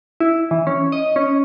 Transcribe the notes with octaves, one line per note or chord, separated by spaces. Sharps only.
E4
E3
C#4
D#5
C#4